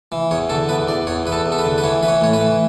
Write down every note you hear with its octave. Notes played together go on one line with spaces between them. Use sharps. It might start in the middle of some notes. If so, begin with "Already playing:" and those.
E3
E2 C#5
D3 A4
E2 B4
E2 D5
E2 C#5
E2 B4
A4
E2
A4
B4
D3
B4
E3 C#5
E3 B4
C#5
A2 C#5
B4
E3